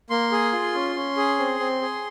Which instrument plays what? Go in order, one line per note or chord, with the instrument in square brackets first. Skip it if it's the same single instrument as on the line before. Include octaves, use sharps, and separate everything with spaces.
[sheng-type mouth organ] A#3 C6
G#4
F4
C#4
C#4
G#4
C4
C4
G#4